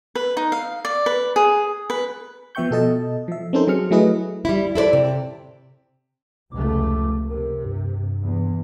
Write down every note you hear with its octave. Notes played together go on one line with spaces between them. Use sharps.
B4
D#4
F5
D5
B4
G#4
B4
F3 B3 E5 G5 C#6 G6
B2 A4 D#5 A5
F3 E5
C4 C#4 D#4 A4 A#4 C5
F#3 G#4 F6 C#7
F#3 A3 E4 G#4 B4 D#5
G3 E4
E4 A4 B4 D5
C3
F1 C#2 A3 D6
C3 A#4
G2
E2